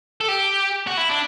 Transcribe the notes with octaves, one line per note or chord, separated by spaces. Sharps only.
A4
G4
F#4
E4
D4